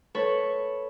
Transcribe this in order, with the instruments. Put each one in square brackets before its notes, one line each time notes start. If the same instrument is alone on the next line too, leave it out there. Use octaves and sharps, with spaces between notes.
[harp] A4 B4 C#5 C#6